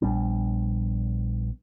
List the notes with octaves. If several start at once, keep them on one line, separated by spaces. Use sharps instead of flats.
A#1 G3 B3 D4